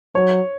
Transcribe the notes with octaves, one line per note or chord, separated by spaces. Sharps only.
F#3 C#5